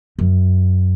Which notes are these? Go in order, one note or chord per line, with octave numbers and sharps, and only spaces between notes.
F#2